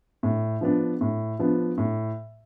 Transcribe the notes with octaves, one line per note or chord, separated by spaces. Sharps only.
A2
F3 B3 D4
A2
F3 B3 D4
A2